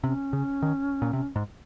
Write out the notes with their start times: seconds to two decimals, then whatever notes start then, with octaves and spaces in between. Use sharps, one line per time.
0.04 C3 C#4
0.33 C#3
0.62 D#3
1.02 A#2
1.13 C3
1.36 G#2